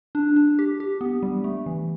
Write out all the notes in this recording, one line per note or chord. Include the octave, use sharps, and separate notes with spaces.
D4
D4
G4
G4
B3
G3
A3
E3